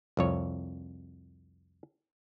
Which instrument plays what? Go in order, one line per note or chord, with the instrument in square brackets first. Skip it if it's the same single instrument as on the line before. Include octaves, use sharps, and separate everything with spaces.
[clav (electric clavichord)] C2 F2 C#5